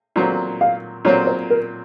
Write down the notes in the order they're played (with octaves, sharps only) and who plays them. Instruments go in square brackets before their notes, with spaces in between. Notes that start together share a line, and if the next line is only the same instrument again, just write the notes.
[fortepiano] A#2 F#3 C4
[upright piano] F5
[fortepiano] A#2 F#3 C4 [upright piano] C#5
[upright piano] C5
A#4